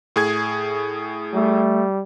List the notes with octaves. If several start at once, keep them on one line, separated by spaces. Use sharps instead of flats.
A2 G#4 G#6
G3 A3